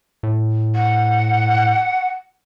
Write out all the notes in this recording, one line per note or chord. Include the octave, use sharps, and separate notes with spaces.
A2
F#5